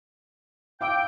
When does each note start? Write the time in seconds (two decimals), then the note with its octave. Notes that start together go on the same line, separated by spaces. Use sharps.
0.81 F5 G5 D6 E6